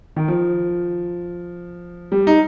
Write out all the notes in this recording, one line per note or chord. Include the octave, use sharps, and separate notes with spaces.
D#3
F3
G3
D#4